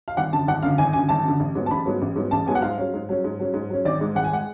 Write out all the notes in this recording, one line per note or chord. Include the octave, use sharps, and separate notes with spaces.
F5
G#1 F#5
F#2 D3 A5
G#1 F#5
F#2 D3 F5
G#1 G#5
F#2 G#5
D3
G#1 A5
F#2 D3
A1
G#2 F#3 B3
A5
A1 B5
G#2 F#3 B3
A1
G#2 F#3 B3
A1 A5
G#2 F#3 B3 G#5
F#5
G#2 F5
F#3 C#4
G#2
F#3 C#4
G#2
F#3 C#4
G#2
F#3 C#4
G#1 D5
G#2 G#3
G#1 F#5
G#5
G#3 F#5